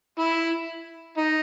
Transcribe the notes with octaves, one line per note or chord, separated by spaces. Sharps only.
E4
D#4